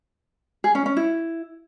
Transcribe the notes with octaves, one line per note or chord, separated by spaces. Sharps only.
G#4
C#4
C#4
E4